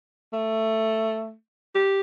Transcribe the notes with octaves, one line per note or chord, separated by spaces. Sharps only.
A3
G4